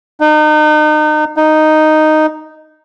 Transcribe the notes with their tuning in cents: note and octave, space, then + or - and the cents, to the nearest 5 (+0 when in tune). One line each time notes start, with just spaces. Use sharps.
D#4 -35
D#4 -5